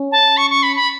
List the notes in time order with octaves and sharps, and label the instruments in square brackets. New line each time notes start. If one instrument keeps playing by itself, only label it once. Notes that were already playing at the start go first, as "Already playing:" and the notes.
Already playing: [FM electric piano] C#4
[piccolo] A5
C#6
C#6
B5
B5